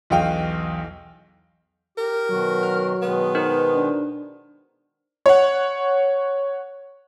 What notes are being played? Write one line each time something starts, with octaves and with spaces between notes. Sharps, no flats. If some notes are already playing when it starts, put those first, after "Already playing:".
B1 E2 F#4 D#5 F5 G5
G4 A#4
B2 D#3 F#3 F#4
F6
B2 D#3 G#3 B3
D#4 A#4 C5
D4
C#5 F#5